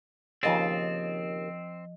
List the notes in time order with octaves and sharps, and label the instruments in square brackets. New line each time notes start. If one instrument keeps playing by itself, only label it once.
[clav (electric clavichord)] D#2 C#3 [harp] F3 D#5 A6 [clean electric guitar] C4